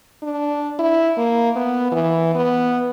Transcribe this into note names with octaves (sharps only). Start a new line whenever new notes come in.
D4
E4
A#3
B3
E3
B3